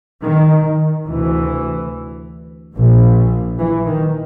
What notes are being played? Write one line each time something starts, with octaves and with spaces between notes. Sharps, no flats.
D#3
D2 C3 E3
A#1 A#2
E3
D#3